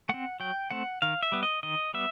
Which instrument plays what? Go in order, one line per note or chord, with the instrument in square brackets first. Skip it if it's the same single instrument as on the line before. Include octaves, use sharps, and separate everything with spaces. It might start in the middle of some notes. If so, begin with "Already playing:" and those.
[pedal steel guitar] A3 C4 F#5
F#3 G5
A3 C4 F#5
D#3 F5
E5
G3 B3
D#5
D#3 D#5
G3 B3 E5